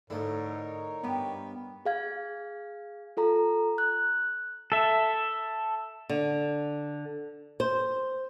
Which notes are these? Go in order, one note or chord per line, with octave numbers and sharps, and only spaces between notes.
G#2 D3 A3 D#4 E4 A#4 C#5
G2 B3 G4
G#4 F5 G#6
F4 A4 A#5
F#6
A4 E5
D3
C5